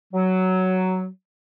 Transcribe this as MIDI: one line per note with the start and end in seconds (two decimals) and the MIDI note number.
0.13 1.06 54